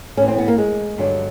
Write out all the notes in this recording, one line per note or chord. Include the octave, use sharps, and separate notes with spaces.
A2 E3 C#4
C4
B3
A#3
G#3
G2 D3 F#3